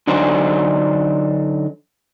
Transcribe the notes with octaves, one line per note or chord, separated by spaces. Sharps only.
D3 F#3 D4 D#4 C5